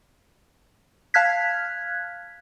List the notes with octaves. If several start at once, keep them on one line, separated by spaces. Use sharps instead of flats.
F5 A5 F6 F#6 G#6 B6